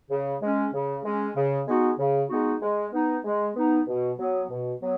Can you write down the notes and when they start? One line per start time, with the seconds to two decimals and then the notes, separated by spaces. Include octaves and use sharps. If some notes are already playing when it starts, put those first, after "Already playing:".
0.11 C#3
0.42 G#3 C#4
0.73 C#3
1.04 G#3 C#4
1.36 C#3
1.68 G#3 B3 D#4 F#4
1.99 C#3
2.30 G#3 B3 D#4 F#4
2.62 G#3
2.93 B3 D#4
3.24 G#3
3.55 B3 D#4
3.87 B2
4.19 F#3 B3
4.50 B2
4.81 F#3 B3